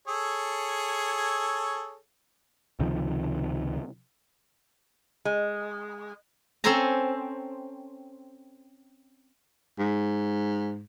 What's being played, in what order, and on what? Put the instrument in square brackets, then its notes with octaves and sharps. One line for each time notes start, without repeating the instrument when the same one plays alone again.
[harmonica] G#4 A4 C#5
[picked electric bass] C#2 C3 D#3 F3
[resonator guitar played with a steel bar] G#3
[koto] C4 C#4 A4 C5 G#5 A#5
[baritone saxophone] G#2